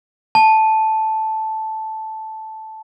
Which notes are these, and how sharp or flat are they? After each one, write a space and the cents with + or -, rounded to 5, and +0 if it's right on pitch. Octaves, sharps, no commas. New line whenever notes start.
A5 -5